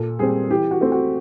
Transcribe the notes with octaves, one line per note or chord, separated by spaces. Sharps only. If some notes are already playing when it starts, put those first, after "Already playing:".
Already playing: A#2 A4
G3 C4 G#4
E3 G4
F#4
A3 C4
F#4